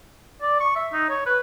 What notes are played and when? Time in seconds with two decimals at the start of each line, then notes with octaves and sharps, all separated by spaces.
0.41 D5
0.60 C#6
0.76 E5
0.93 D#4
1.09 C#5
1.26 B4